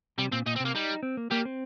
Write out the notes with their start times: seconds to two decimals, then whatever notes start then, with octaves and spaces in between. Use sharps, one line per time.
0.18 C3 G3
0.32 A#2 C4
0.46 A#2 D#4
0.56 C4
0.60 C3
0.65 A#3
0.74 G3 D#4
1.03 C4
1.17 A#3
1.31 G3 A#3
1.45 C4